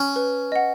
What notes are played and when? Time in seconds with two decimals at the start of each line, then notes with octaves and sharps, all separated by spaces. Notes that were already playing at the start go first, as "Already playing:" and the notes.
Already playing: C#4
0.16 B4
0.52 D#5 F#5